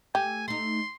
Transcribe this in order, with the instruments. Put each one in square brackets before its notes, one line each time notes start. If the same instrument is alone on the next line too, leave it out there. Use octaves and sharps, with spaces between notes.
[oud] A3 [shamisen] G4 [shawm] G#5
[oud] A3 D#4 [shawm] C6